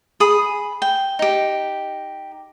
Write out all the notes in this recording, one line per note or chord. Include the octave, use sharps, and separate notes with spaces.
G#4 B5 D#6
G5
D#4 G4